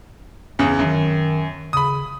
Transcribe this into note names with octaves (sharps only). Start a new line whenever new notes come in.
E2 G2 C#3
F#2 D#3
C#3 B5 D#6